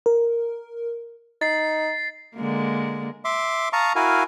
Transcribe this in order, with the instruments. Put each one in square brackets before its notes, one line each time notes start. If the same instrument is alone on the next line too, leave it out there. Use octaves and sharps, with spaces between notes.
[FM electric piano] A#4
[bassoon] D#4 [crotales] A6 C7
[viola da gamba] D3 G#3 A#3
[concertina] E5 C6 D6
F5 A5 A#5 C#6 D#6
E4 F#4 A#4 F5 G#5